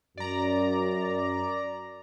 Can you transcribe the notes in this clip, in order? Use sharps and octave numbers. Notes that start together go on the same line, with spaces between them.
F#2 D5 A#5